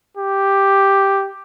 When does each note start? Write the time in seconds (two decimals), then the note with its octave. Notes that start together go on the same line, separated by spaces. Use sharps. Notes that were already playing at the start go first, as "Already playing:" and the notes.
0.18 G4